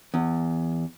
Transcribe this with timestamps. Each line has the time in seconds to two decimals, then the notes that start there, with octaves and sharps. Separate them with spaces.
0.14 E2